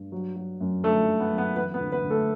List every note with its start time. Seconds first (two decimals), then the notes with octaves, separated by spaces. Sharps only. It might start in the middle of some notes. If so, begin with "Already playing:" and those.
Already playing: G2
0.12 F#3
0.36 F#3
0.61 F#2
0.84 G1 A3 A4
1.08 G1
1.20 B3 B4
1.32 F#2
1.38 B3 B4
1.56 E3 B3 B4
1.74 B3 B4
1.81 D2
1.92 B3 B4
2.04 D2
2.10 A3 A4